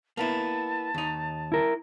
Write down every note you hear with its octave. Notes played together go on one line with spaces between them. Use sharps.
A#3 B3 E4 A5
D#2 D#4
E4 A#4